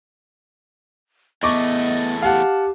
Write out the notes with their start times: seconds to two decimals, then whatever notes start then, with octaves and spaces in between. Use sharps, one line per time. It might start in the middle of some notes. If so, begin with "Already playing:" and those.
1.43 E2 A3 B3 D#5 C#6 D6
2.23 G4 F5 F#5 A5